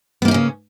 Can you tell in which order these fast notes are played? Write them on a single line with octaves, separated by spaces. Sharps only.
B3 A#3 D#4 C#4 C#3